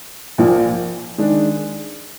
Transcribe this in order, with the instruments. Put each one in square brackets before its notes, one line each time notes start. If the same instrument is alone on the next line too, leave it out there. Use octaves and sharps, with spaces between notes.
[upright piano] A#1 A#2 F3 A#3
D#3 G#3 D4